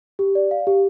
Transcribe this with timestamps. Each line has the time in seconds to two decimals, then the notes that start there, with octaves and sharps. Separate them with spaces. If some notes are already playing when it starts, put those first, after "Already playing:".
0.19 G4
0.35 D5
0.51 F5
0.67 G4